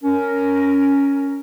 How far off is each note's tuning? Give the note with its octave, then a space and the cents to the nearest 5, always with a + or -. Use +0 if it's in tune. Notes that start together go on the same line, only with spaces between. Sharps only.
C#4 +10 A#4 +0